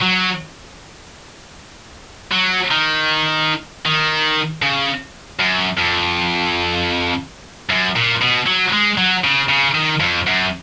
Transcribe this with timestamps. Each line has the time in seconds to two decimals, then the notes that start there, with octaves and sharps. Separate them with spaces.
0.01 F#3
2.32 F#3
2.71 D#3
3.85 D#3
4.62 C#3
5.40 F#2
5.79 F2
7.70 F#2
7.96 A#2
8.22 B2
8.47 F#3
8.73 G#3
8.98 F#3
9.24 C#3
9.49 C#3
9.75 D#3
10.00 F2
10.27 F#2